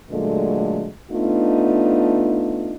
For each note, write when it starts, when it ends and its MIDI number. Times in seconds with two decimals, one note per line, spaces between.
0.11 0.88 46
0.11 0.88 50
0.11 0.88 54
0.11 0.88 56
0.11 0.88 57
1.11 2.76 57
1.11 2.76 59
1.11 2.76 62
1.11 2.76 63
1.11 2.76 65